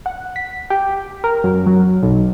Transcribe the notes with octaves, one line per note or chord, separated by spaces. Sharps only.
F#5
B6
G4
A#4
F#2
F#3
B1